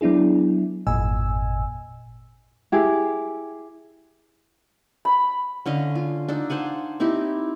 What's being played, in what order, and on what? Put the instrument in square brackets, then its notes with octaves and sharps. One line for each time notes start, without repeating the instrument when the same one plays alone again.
[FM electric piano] F#3 B3 D4 E4 G#4
G#1 F2 A#2 D#5 G#5 E6
[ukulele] E4 G4 G#4
[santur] B5
[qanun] D3 C#4 D#5 F5
F4
D4 D#4 A4
C5 F5 F#5 G#5
C4 D#4 E4 G4